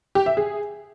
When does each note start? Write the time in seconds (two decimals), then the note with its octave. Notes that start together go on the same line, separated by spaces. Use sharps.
0.15 G4
0.26 E5
0.37 G#4